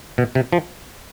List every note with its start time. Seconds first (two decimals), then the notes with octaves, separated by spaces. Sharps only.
0.18 B2
0.35 C3
0.53 F3